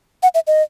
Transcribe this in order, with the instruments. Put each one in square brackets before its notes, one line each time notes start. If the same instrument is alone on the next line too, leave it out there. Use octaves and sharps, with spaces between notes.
[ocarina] F#5
E5
D#5